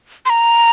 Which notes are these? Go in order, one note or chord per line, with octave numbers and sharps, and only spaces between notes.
C6
A#5